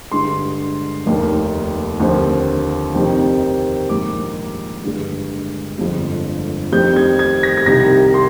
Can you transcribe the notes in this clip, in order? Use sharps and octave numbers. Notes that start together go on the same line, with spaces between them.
G2 D3 G#3 C6
F1 D#2 D#3 A#3
D#2 D3 F3 C4
F2 C3 D#3 G3 C4
A#1 G#2 D#3 A#3 D6
G2 D3 G#3
G1 F2 D3 F3 G#3
F2 D#3 G3 C4 G6
G#6
G#6
A#6
G#6
C2 C3 D#3 G3 A#6
C6